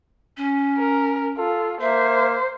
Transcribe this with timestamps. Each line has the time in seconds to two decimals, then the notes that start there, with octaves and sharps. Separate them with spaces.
0.37 C#4
0.78 A#4
1.38 F4 A4
1.81 A#3 C5 E5